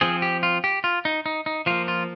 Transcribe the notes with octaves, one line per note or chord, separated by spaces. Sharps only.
F3 C4 G#4
G4
F4
G4
F4
D#4
D#4
D#4
F3 A#3 F4
F4